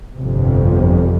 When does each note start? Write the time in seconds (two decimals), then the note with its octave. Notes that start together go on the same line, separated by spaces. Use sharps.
0.16 G1 F2 C3